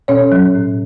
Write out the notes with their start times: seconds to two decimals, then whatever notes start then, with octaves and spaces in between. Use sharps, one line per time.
0.08 B2 C#4 C#5
0.32 F#3
0.55 A2